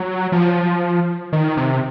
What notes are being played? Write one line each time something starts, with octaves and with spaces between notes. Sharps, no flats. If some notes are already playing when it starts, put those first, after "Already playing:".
Already playing: F#3
F3
D#3
C3